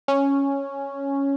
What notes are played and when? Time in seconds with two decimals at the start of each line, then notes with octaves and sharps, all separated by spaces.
0.08 C#4